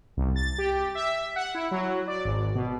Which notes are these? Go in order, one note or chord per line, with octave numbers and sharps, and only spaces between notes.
C2
A6
G4
E5
F#5
E4
F#3
D5
G#1
B2